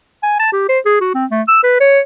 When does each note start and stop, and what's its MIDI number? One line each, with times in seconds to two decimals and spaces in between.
0.23 0.38 80
0.40 0.50 81
0.53 0.68 67
0.69 0.79 72
0.86 0.96 68
1.01 1.11 66
1.14 1.25 60
1.31 1.42 57
1.48 1.60 88
1.63 1.77 71
1.80 2.00 73